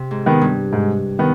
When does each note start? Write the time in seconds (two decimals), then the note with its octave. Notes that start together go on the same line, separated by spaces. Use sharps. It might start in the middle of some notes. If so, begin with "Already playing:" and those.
Already playing: C3
0.11 G#2
0.26 D#3 B3
0.41 G2
0.73 G#2
1.19 D#3 B3